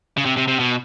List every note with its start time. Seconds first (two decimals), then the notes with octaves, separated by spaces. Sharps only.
0.17 C#3
0.25 C3
0.37 C3
0.48 C3
0.59 B2